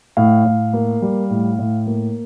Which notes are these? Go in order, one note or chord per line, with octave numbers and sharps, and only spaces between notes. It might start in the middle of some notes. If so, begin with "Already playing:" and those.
A2 F5
A2
A#3
G3
A2
A2
A#3